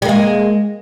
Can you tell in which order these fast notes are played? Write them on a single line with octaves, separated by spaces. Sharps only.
G3 A#3 G#3